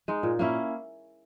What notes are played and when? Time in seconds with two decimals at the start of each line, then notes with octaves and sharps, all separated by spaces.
0.08 G#3 D#4
0.23 A#2
0.39 A#3 C#4 E4